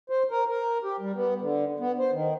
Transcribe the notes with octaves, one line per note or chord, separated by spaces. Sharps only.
C5
A#4
A#4
G4
G3
B3
D3
B3
C5
D#3